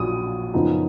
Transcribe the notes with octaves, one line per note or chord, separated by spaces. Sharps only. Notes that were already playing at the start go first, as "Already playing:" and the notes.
Already playing: A#1 A#2 F#3 D#6
F#2 C#3 F3 B3 D#4